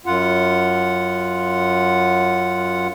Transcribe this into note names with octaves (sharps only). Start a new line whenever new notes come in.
F#2 F4 F#5